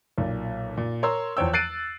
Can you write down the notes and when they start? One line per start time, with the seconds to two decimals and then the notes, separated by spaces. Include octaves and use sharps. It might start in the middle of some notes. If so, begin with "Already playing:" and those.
0.18 B1 A#2
0.77 A#2
1.03 A#4 C#5 A#5 C6 E6
1.37 E2 F3 C5 C#5 G5 E6
1.53 F#6 A6 C7 D7 D#7